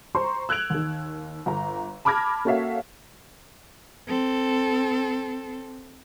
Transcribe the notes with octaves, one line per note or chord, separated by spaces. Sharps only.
C5 A#5 C6 C#6
E6 F#6 G#6 D7 F7 F#7
D#2 D#3
G1 A#5
A5 B5 D6 F6 G#6 A#6
A#3 C#4 F#4 A4 E5 F5
C4 A4